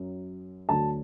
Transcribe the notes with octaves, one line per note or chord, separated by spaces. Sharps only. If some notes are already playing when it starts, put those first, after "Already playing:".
Already playing: F#2 F#3
D2 D3 F#3 A5